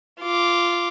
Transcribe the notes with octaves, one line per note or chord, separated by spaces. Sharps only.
F4 D6